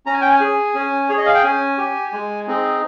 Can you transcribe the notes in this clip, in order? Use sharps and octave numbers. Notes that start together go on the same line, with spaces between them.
C#4 A#5
G#5
G5
G#5
G#4
C#4
G#4 C#5
D#5
F5
G5
C#4 G#5
G4
G#3
C4 D#4 G#4